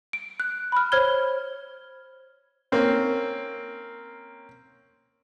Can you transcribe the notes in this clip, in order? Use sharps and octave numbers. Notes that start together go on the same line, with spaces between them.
D7
F#6
B5 F6
C5 C#5 F6 G#6 G7
A#3 C4 C#4